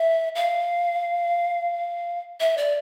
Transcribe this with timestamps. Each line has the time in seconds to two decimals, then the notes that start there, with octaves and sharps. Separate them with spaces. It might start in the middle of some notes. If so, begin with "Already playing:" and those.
Already playing: E5
0.35 F5
2.40 E5
2.58 D5